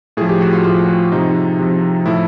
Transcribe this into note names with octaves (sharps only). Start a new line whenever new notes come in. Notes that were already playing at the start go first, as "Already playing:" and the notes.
A2 F3 G#4
G4
F#4
F4
A2 F3 F4
C3 F3 D#4
C3 F3
A2 F3 E4